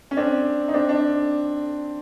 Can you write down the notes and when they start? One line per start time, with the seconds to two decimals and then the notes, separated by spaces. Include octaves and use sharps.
0.11 C#4
0.17 C4 D4
0.68 D#4
0.74 C4 D4
0.89 D4